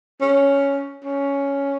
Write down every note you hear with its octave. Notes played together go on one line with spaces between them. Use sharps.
C#4
C#4